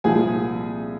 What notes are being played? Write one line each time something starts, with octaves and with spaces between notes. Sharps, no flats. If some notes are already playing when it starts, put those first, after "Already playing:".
C2 A#2 F3 G#4 G#5